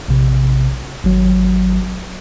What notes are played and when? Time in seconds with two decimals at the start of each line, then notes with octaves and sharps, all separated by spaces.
0.08 A#1 C3
1.04 G#1 F#3